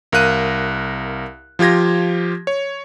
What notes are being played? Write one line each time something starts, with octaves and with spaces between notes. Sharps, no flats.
C2 A#4 F5 F#6 D#7
F3 F4 G4 G#6 A#6
C#5